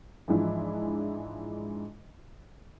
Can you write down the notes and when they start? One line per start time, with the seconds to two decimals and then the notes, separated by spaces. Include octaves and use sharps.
0.28 G#2 E3 F3 G#3 D4 E4